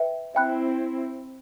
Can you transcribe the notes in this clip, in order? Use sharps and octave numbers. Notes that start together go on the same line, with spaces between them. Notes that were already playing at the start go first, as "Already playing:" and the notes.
Already playing: B4 E5 G5
C4 E4 E5 G5 B5 F#6